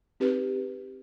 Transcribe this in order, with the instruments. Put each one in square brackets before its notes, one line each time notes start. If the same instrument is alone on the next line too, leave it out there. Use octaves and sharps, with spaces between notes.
[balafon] C4 D#4 G4 B4